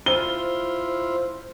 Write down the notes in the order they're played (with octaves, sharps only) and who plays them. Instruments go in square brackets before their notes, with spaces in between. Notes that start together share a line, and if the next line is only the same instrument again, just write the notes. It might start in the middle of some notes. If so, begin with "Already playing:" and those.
[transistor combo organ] E4 F4 [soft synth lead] C5 [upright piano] G7